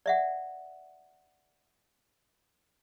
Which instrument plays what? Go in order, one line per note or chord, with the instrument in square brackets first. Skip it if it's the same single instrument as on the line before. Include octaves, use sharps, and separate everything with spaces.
[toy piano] D5 E5 F#5